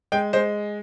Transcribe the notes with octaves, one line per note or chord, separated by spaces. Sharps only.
G#3 G5
G#3 C5